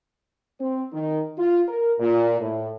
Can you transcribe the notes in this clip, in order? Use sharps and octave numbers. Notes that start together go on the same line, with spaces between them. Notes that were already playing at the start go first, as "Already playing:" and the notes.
C4
D#3
F4
A#4
A#2
A2